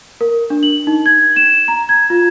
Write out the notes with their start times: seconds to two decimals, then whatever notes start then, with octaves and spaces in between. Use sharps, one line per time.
0.21 A#4
0.50 D4
0.63 F#7
0.87 D#4
1.06 G#6
1.36 E7
1.68 A#5
1.89 G#6
2.10 F4